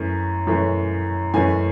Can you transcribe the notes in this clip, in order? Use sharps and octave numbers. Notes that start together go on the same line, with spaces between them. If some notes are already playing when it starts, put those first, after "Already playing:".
Already playing: F#2 E3 A3 C#4
F#2 E3 A3 C#4
F#2 E3 A3 C#4 G#5